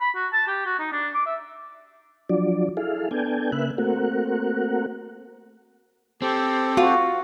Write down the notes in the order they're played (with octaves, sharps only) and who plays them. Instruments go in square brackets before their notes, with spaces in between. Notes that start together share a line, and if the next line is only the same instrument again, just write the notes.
[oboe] B5
F#4
A5
G4
F#4
D#4
D4
D6
E5
[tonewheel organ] F3 F#3 D4 D5
E4 G#4 A4 F5
B3 D4 A4 G5 G#5
C#3 A#3 B4 E5 F#6
A3 A#3 C4 F#4 A#4 F#5
[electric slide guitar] C4 [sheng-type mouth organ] G4 A4
[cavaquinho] F4 [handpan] F#4